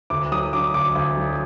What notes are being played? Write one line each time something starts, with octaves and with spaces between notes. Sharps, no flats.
D2 D6
F#3 D#6
D3 D6
D2 D6
D2
F#3